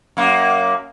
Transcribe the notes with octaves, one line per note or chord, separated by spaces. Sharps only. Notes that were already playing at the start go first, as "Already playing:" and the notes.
F#2 A#3